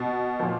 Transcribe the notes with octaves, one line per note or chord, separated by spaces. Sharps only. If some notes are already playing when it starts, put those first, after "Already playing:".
Already playing: B2
A#2 F3